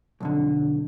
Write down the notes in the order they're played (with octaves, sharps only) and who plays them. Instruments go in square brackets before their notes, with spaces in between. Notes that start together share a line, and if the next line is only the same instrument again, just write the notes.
[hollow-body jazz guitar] B1 F2 D3